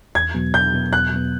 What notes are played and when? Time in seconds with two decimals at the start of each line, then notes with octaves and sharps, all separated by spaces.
0.15 E2 G#6
0.34 B2 F#3 B3
0.54 E2 G6
0.74 B2 F#3 B3
0.93 E2 F#6
1.12 B2 F#3 B3